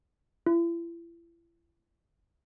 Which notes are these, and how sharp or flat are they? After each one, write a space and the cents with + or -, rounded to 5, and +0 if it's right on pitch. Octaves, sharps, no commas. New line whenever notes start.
E4 +40